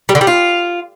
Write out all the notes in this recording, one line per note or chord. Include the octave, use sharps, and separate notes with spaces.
G3
D3
G3
F4